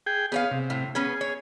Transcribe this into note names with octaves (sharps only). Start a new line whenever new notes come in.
G#4 G5
B3 G#4 C#5 F5
C3
A2
B3 C#4 G#4 B4
C#5